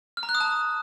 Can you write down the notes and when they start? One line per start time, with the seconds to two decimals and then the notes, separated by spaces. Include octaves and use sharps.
0.17 F6
0.23 A#5
0.29 F#6
0.35 D#6
0.40 A5